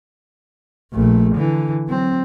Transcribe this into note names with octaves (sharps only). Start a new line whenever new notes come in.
A#1 A3
D3 E3
F#3 C4